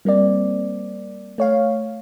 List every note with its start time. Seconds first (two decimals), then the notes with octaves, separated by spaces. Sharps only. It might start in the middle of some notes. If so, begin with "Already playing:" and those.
0.05 G3 A#3 C4 D5
1.38 A3 C#5 F5